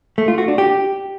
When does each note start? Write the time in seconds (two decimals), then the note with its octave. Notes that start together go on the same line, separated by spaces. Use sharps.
0.18 A3
0.28 F4
0.38 F#4
0.48 D4
0.58 G4